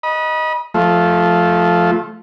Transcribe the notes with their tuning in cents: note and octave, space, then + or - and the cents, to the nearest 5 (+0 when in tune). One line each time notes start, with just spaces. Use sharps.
D#5 +0 B5 -35
F3 +0 A3 -15